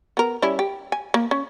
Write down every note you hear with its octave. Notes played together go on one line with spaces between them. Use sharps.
B3 A#4
G3 C#4 E4
G4
G#5
A#3
C#4